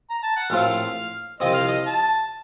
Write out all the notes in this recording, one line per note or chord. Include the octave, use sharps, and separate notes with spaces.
A#5
A5
F#5
A#1 A2 A3 C4 F4 F5
C2 C3 F3 C4 D#5
F5
D#5
A5